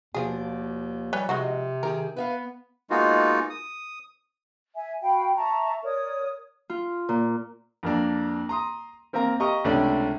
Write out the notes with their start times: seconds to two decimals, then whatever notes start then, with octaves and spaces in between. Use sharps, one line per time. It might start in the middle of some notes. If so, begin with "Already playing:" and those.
0.14 D#2 B2 F3 F4 G#4 D5
1.13 G3 B4 C#5 G#5
1.29 C3 G#3 D#4 F#4
1.83 D#3 G4 G#4 A#4
2.17 B3 B4 E5 F5
2.90 G#3 A#3 B3 D#4 F4 F#4
3.50 D#6
4.75 E5 G#5
5.02 F#4 F5 G5 B5
5.36 E5 A5 A#5 C#6
5.83 A#4 C#5 D5 D#6
6.69 F4
7.09 A#2
7.83 F2 A#3 D4
8.49 A#5 C6 D#6
9.13 A#3 C4 A#4 F5 A#5
9.40 G4 D#5 F5 A#5 C#6 D#6
9.64 C#2 C3 A3 C#4 D4 D5